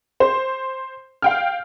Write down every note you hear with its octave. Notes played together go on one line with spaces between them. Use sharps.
C5
F5 G5 F6